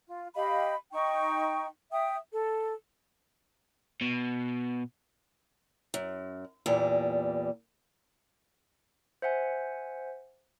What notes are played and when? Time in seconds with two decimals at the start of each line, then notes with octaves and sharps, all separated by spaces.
0.07 F4
0.35 G4 D#5 F5 B5
0.93 D#4 G5 C#6
1.92 E5 G5 D#6
2.31 A4
4.01 B2
5.94 F#2
6.66 E2 A#2 G3
9.22 C5 E5 F#5 G#5